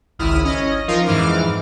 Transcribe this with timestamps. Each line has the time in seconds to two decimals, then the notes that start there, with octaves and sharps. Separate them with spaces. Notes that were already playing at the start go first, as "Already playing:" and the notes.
0.19 G#1 C#2 E4 D#6 F6
0.44 C#4 D#5
0.88 F3 D#4 F4 A#4
1.06 F2 G#2 E3 D6 F6